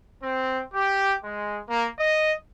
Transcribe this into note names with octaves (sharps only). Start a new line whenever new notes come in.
C4
G4
G#3
A#3
D#5